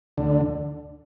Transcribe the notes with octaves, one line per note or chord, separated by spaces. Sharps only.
D2 D3